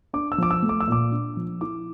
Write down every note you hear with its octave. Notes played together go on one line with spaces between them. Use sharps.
D4 D6
E6
F3 D6
E6
A3
D6
E6
A#2 D6
D4
F3
E4 D6